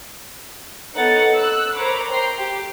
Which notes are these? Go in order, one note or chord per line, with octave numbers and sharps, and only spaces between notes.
B3 D#4 A4 C#5 F#5 A6
E6 F#6
A#4 C5 C#5 A#5 B5 D6
G5 A#5 C6 C7
G4